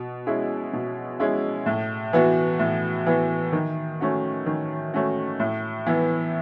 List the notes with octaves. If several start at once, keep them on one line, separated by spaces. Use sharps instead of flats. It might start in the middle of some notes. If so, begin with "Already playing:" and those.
Already playing: B2
G#3 C#4 E4
B2
G#3 C#4 E4
A2
E3 B3 F#4
A2
E3 B3 F#4
D#3
A3 C#4 F#4
D#3
A3 C#4 F#4
A2
E3 B3 E4